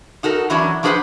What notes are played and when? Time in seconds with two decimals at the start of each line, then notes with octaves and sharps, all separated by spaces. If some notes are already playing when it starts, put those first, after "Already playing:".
0.23 D#4 F#4 A4 A#4
0.50 E3 F#3 C#4 D4 E4
0.83 F3 D4 G#4 B4 C5 F#5